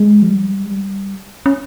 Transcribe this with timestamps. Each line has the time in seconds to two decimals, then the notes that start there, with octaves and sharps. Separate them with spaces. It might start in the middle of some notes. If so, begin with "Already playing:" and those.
Already playing: G#3
0.22 F3
0.30 G3
0.65 G#3
0.71 G3
1.46 C#4